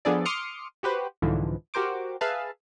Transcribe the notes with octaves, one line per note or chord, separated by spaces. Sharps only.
F3 B3 D4 G#4 A4 D5
C6 D6 D#6 F6 C#7
F#4 G4 B4 C5
C2 G#2 D3 E3 F3
F#4 G4 A#4 C5 D6
G#4 B4 E5 F5 A5